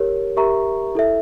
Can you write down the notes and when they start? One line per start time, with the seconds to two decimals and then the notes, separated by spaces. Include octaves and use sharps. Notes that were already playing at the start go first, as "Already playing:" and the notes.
Already playing: G4 A#4 C#5
0.37 G4 A#4 E5 A#5 C#6
0.95 E4 A4 E5